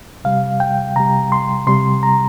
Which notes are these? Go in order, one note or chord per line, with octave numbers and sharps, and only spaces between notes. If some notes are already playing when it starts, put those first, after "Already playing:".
C3 G3 F5
G5
C3 G3 A#5
C6
C3 G3 C6
A#5